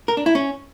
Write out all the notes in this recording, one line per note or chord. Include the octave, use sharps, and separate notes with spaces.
A#4
D4
E4
C#4